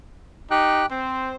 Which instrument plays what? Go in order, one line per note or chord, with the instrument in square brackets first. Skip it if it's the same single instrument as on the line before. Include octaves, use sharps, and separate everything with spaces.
[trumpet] D#4 [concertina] G4 G5 F#6
[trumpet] C4 [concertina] C5